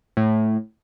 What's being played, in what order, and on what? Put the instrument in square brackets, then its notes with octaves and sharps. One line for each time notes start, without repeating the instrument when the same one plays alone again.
[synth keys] A2